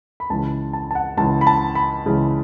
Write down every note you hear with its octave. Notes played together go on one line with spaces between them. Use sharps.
B5
C#2 C#3 E3 A5
A5
A5
F#5
C#2 C#3 E3 A5
B5
A5
B5
C#2 C#3 E3